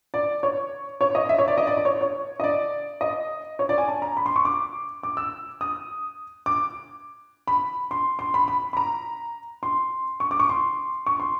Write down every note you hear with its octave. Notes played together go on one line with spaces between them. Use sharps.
D5
C#5
C#5
D#5
E5
C#5
D5
D#5
D5
D5
C#5
C#5
D#5
D5
D#5
C#5
D5
G#5
A5
A#5
B5
C6
C#6
D6
D6
E6
D#6
D6
B5
C6
C6
B5
B5
B5
A#5
C6
C#6
D6
C#6
C6
C#6
C6